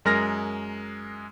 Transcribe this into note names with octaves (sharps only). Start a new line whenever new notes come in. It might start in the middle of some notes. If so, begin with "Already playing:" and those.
F#2 G#3 A#4 F6 A#6